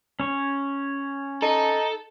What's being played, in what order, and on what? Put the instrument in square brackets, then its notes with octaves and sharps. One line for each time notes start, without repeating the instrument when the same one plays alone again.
[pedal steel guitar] C#4 C#5
[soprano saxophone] D#4 [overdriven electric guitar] A4